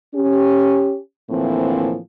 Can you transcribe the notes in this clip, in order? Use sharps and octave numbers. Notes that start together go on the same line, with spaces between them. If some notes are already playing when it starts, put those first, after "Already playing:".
C#4 G4
A2 D3 E3 F3 A#3 C4